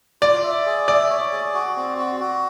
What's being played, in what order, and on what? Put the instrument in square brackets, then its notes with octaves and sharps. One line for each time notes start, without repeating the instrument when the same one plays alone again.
[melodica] F4 [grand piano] D5
[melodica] E5
G#4
[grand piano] D5 [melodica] E5
[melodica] C#5
G#4
F#4
C4
F#4
F#4